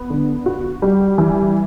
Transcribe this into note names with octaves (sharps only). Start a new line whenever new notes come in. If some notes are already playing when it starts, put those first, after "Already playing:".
Already playing: B3
D3
F#4
G3
E3